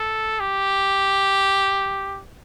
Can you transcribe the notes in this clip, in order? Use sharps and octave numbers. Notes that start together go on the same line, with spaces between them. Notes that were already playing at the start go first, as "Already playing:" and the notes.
Already playing: A4
G4